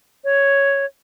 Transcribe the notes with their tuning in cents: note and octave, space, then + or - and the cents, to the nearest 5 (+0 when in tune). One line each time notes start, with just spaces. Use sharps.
C#5 +0